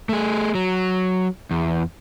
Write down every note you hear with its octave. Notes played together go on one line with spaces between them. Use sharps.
A3 G#4
F#3
E2